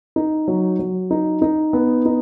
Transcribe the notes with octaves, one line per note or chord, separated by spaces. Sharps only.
D#4
F#3
F#3
D#4
D#4
B3
D#4